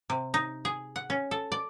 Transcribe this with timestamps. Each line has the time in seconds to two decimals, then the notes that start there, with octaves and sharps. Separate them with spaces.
0.10 C3
0.34 D#4
0.65 G#4
0.96 F#5
1.10 C#4
1.31 A4
1.52 D5